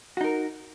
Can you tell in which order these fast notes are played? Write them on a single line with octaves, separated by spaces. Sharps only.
F#4 D#4 A#4